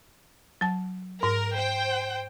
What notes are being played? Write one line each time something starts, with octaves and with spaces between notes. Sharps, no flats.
F#3 A5
G#2 A#4
C5 G5